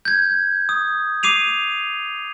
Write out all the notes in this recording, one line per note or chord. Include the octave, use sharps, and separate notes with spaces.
G6 G#6
D#6
D6 C7 D#7 F7